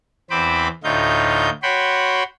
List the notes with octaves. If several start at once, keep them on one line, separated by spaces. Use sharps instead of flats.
E2 C4 C5 B5 D6
D2 A2 D#4 F4 G6
F#4 C#5 G5 B5 C6